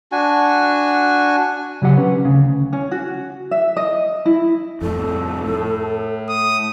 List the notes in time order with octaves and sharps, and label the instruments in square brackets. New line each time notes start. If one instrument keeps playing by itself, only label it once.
[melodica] D4 F#4 G#5
[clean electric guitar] C#3 F#3 G4 F#5
C#4 B4
D2 C#3
[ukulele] C#4
F#4
E5
D#5
E4
[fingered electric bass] F2 A2 [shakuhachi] A4
[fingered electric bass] A2
[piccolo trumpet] D#6